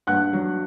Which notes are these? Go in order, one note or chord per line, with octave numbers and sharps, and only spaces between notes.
G2 F#5 F#6
F#3